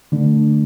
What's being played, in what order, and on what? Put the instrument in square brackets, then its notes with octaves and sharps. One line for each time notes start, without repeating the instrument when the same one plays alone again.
[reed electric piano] D3 A3 D4